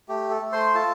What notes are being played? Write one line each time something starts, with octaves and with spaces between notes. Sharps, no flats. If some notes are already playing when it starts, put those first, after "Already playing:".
A3 G4
A4
A3
C5 C6
F4 A4 A5